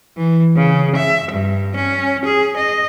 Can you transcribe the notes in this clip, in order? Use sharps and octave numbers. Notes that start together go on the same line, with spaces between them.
E3
C#3
E5
G2
C#4
G#4
D#5